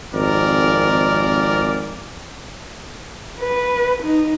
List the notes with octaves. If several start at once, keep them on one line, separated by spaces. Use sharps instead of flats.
G#1 F2 G#2 A#4 D5
B4
D#4